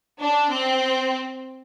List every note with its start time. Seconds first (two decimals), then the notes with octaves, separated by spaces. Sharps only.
0.20 D4
0.51 C4